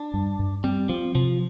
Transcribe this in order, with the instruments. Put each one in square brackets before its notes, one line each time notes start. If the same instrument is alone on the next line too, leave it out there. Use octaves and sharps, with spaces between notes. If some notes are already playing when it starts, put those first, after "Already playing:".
Already playing: [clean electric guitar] D4
[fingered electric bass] G2
G2
[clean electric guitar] G3 [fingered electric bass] C4
[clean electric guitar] F3 [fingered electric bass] C4
[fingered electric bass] C3 [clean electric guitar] F3